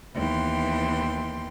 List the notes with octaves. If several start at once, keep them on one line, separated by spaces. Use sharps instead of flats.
D#2 E3 B3 G5 C6